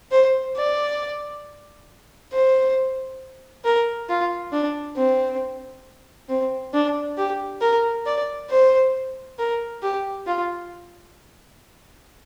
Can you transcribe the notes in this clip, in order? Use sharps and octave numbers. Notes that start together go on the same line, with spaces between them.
C5
D5
C5
A#4
F4
D4
C4
C4
D4
G4
A#4
D5
C5
A#4
G4
F4